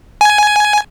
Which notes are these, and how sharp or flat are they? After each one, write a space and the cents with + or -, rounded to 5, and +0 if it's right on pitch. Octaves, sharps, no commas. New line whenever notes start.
G#5 +10